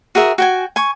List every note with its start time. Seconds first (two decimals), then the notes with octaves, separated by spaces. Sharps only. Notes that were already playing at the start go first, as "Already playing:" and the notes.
0.15 F#4 G#4 A#4 E5
0.38 F#4 G5 G#5
0.76 G#5 C#6